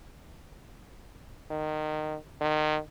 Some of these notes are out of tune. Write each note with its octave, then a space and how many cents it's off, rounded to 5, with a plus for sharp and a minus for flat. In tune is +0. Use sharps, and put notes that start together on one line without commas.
D#3 -20
D#3 -25